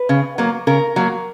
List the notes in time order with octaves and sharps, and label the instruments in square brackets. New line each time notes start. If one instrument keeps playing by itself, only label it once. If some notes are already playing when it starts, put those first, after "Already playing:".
Already playing: [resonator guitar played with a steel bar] B4
C#3
F#3 A#3
C#3 A#4
F#3 A#3